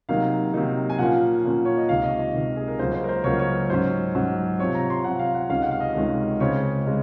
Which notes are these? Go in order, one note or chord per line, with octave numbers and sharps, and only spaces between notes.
C3 D#3 F#3 A#3 D#4 F5
C3 D#3 F#3 A#3 D#4
G#5
A#2 F3 A#3 C#4 F#5
A#2 F3 A#3 C#4
C#5
D#5
C#2 C3 D#3 F5
D#5
D#5
C#2 C3 D#3
G#4
A#4
C#2 C#3 F#3 A#3 C#4 C5
C5
A#4
C5
C#2 C#3 F#3 A#3 C#4 C#5
C#5
G#2 F#3 C#4 C5
G#2 F#3 C#4
C3 F3 C4 C#5
A#5
C6
C3 F3 C4 F#5
F5
F#5
C#2 C3 D#3 G#3 C#4 F5
F#5
F5
D#5
C#2 C3 D#3 G#3 C#4
C#2 C#3 G#3 C4 C#5
C#3 G#3